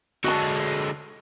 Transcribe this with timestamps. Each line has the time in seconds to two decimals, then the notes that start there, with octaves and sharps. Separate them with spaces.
0.24 D3 G#3 F#4 A5